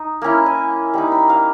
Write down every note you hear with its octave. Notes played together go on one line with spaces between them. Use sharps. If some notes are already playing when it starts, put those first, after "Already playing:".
Already playing: D#4
A#3 C#4 E4
G#5
G3 A#3 D#4 B5
B5
F5